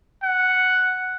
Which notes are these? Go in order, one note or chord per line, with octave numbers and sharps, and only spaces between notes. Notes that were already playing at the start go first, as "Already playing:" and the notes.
F#5